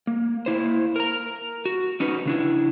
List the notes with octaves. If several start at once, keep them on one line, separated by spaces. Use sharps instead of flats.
A#3
A#3 E4 C5
A#4 A#5
F#4
C#4 D#4 F#4 B4
C#3 D4 E4